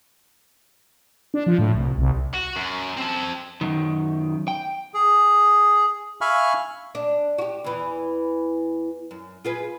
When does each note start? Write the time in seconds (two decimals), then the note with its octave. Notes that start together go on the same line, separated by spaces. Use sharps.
1.34 D4
1.47 F3
1.59 A2
1.75 C2
1.99 C2
2.34 F#4
2.56 F#2
2.97 C4 A5
3.61 F#2 D#3
4.48 G5
4.94 G#4
6.21 E5 F5 G#5 B5 C#6 F6
6.95 D4
7.38 F#4 G4
7.64 E2 E3
9.11 F#2
9.45 F4 G#4 B4